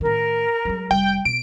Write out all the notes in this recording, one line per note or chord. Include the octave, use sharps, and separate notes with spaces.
A2 D#3 A#4
F#3 G#3
F1 G3 G5
B2 D7